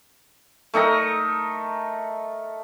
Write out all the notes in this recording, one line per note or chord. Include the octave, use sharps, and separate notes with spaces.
A3 D#4 A#4 A#5